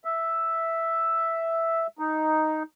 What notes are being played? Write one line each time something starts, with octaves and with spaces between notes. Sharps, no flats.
E5
D#4